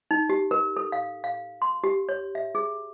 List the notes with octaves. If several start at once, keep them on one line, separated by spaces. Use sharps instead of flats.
D#4
G4
A#4
A4
F5
F5
C6
G4
C#5
E5
G#4